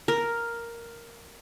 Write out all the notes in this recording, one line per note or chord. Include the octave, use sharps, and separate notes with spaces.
A#4